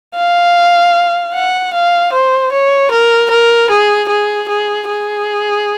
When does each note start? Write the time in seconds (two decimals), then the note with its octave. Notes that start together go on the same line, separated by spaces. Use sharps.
0.16 F5
1.34 F#5
1.73 F5
2.13 C5
2.52 C#5
2.91 A#4
3.30 A#4
3.70 G#4
4.10 G#4
4.49 G#4
4.89 G#4